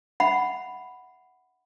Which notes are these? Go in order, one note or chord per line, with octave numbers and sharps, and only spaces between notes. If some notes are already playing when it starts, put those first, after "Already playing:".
E5 F#5 B5